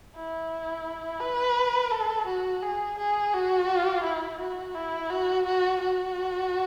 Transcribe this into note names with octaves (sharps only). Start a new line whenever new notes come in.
E4
B4
A4
F#4
G#4
G#4
F#4
E4
F#4
E4
F#4
F#4
F#4